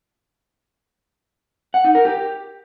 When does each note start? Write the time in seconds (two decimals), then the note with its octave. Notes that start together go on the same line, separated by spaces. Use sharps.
1.74 F#5
1.84 D#4
1.95 A#4
2.05 G4